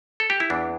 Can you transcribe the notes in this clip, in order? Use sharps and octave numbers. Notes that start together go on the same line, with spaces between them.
A4
G4
E4
E2 E3 D4